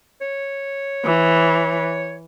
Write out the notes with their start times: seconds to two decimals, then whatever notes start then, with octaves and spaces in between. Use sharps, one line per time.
0.21 C#5
1.04 E3